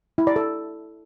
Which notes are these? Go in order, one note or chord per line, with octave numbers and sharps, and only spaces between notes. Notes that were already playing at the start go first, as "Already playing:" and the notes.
E4
D5
A4